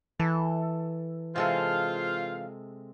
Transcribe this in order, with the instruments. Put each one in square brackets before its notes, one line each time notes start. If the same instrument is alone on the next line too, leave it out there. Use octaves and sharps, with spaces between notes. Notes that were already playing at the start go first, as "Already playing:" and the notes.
[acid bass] E3 [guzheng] A4
[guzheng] C3 G#3 A4 [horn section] F4 C5 F5